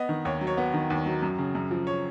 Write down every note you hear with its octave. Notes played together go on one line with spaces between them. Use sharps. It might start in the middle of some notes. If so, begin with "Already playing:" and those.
Already playing: B3 D#5
D#3
D#2 C#5
F#3
C#5
B3
D#3
D#2
F#3
F#2
C#3
F#2
F3
C#5